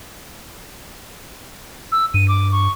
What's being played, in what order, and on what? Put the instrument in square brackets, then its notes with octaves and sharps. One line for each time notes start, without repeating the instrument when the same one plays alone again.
[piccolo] E6
[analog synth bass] G2 [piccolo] D#7
[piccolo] D6
C#6